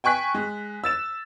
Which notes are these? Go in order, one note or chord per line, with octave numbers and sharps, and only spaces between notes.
G5 G#5 C#6 F#6 B6
G#3
E6 A6 E7